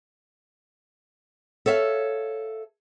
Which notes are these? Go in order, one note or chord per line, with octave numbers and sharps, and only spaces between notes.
A4 C#5 E5 F5